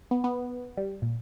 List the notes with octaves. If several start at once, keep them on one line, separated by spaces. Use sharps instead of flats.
B3
B3
G3
A#2